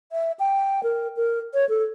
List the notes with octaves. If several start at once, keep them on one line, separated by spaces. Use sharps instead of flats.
E5
G5
A#4
A#4
C#5
A4